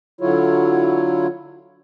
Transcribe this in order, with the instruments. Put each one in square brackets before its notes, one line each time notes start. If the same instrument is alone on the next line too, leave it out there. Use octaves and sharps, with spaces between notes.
[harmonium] D3 F#3 E4 F4 C#5